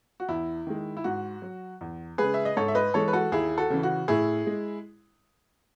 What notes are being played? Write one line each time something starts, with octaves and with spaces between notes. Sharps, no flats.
F#4
E2 E4
D#3 G#3
E4
G#2 F#4
F#3
E2
C#3 G#3 G#4 B4
E5
D#5
G#2 A4 C#5
E5
B4 D#5
E3 G#3 A4 C#5
B4
F#4 A4
D#2 E4 G#4
F#4 A4
C#3 E3
F#4
A2 E4 G#4
G#3